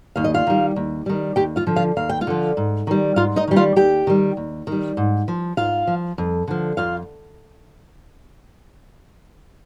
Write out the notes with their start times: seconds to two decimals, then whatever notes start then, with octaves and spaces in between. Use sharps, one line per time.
0.16 D#2 F5
0.24 D#5
0.34 F4 F5
0.47 D#3 G3
0.76 D#2
1.06 D#3 G3
1.36 D#2 G4 G5
1.56 F4 F5
1.67 D3 F3
1.76 F4 F5
1.97 D#2 F5
2.09 G5
2.21 F4 F5
2.27 D3 F3
2.57 G#2
2.87 D#3 G3
3.16 G#2 F4 F5
3.36 D#4 D#5
3.47 D#3 G3 G5
3.56 F4 F5
3.76 D#2 G4 G5
4.07 D#3 G3
4.37 D#2
4.67 D#3 G3
4.97 G#2
5.28 F3
5.57 G#2 F4 F5
5.87 F3
6.18 F2
6.48 D3 F3
6.77 F2 F4 F5